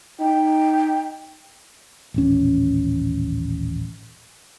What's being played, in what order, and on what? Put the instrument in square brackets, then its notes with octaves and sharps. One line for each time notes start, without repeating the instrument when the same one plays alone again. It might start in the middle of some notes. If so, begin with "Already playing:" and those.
[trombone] D#4 [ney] G5
[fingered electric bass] D#1 A1 C#4